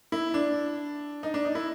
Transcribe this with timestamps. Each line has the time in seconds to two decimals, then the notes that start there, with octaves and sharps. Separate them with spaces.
0.12 E4
0.34 D4
1.23 D#4
1.34 D4
1.45 D#4
1.55 E4